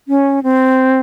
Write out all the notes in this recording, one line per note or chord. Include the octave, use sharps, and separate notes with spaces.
C#4
C4